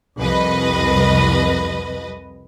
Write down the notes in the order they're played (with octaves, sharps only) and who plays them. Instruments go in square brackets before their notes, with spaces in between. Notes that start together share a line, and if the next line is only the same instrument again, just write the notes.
[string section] C2 F2 B4 D#5